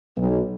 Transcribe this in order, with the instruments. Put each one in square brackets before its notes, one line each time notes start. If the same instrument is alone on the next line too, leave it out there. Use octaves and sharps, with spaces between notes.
[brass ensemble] B1